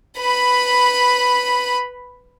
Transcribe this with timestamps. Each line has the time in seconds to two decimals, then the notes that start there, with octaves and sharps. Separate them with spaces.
0.18 B4 B5